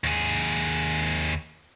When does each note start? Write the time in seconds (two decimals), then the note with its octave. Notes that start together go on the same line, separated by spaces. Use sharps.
0.04 D#2 G#4